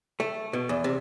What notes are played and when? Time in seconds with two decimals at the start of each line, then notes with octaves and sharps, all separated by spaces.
0.20 A3
0.53 B2
0.69 E2
0.84 C3